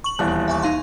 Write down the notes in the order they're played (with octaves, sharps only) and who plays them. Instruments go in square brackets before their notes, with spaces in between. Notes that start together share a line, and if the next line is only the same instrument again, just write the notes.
[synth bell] C#6 F#7
[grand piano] D#1 E2 [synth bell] F#6
[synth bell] E5 G#5 C#6
D#4 F5 C6